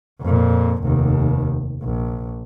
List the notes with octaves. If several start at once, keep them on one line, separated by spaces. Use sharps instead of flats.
F2 A#2
F1 D#2
A#1